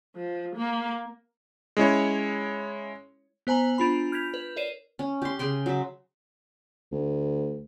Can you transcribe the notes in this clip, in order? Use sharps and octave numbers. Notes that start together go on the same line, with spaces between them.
F3
A#3
G#3 C#4 E4 C#5
B3 C5 G#5 A#5 F#7
D4 F4 B5
F6 G6 G#6 B6 F7
B4
A#4 C#5 D5 C7 D#7 E7
C#4
G4 C6
C#3 G#4 G5 C6
F#3 E5
D2